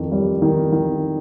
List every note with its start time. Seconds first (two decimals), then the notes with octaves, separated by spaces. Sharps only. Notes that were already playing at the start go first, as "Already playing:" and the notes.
Already playing: F2 D#3
0.12 G3
0.42 D#3
0.72 D#3